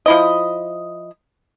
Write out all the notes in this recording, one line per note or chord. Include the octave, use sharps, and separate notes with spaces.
F3 E4 D#5